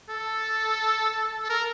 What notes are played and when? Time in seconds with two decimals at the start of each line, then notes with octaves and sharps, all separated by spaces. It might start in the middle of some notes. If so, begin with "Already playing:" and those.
0.09 A4
1.44 A4
1.50 A#4